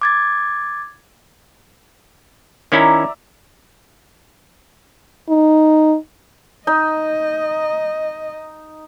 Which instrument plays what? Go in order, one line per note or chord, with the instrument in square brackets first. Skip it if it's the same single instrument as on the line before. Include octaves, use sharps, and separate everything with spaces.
[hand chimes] D6 G#6 A6
[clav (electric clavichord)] D#3 C#4 E4 [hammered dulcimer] D5 E5 A#5
[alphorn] D#4
[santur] D#4 [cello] D#5